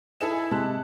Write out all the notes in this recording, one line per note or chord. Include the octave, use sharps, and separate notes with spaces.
D#4 E4 G#4 A4 E7
G#5
C3 G#3 A5 F#6